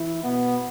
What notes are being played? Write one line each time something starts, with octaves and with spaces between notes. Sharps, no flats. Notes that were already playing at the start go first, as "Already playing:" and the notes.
Already playing: E3 E4
B2 B3